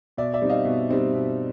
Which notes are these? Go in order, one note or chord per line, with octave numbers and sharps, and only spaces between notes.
B2 D5 E5
D5 E5
G3 C4 D#4
D#5 F5
B2
G3 C4 D#4
B2